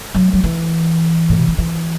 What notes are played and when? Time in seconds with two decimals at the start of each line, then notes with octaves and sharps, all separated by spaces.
0.15 F#3
0.33 F#3
0.44 E3
1.29 A2
1.38 B2
1.48 D3
1.58 E3